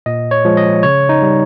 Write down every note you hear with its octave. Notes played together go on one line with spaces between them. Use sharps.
A#2 D#5
C#5
F3 G#3
D#5
C#3 C#5
D#4
G3